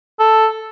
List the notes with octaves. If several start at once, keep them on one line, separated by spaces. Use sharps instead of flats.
A4